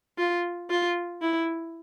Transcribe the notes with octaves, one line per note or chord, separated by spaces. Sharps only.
F4
F4
E4